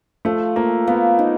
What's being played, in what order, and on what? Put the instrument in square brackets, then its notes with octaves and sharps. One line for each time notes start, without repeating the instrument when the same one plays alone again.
[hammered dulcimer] F3 [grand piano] A3
[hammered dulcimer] F3 [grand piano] A#3
[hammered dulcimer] A#3 [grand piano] B3
[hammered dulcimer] D#4